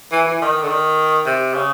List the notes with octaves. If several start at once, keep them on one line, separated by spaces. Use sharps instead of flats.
E3
E3
D#3
D3
D#3
C3
C#3